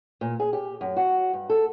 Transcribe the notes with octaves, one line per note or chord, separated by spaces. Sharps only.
A#2
G#4
G4
F#2
F#4
G2
A4